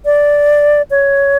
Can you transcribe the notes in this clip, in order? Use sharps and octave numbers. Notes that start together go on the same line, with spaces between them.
D5
C#5